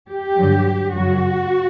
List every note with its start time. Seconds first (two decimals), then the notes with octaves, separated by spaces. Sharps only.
0.09 G4
0.37 G2 D3 F#3
0.93 F#2 C#3 F#3 F#4